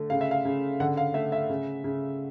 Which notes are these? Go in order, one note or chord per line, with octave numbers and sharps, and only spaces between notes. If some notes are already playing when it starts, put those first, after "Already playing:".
Already playing: D3 A3
C#3 F5
E5
F5
C#3
D3 F#5
F5
A3 E5
E5
C#3
C#3